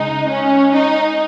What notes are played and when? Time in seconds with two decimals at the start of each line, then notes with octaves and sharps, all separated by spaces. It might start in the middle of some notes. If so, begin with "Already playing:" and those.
Already playing: C#3 G#3 D#4
0.30 C#4
0.74 D#4